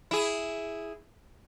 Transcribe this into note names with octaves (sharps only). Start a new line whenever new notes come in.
E4 G#4